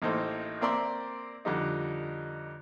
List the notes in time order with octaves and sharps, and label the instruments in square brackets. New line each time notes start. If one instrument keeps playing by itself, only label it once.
[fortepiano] A1 A2 A#3 D#4 A4 C5
A#3 C4 A#4 D5 E5 C6
F2 D3 G3 D#4